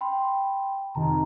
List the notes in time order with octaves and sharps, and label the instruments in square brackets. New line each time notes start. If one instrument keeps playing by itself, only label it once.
[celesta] G5 B5 C6
[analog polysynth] F2 C3 D#3 [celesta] A5 A#5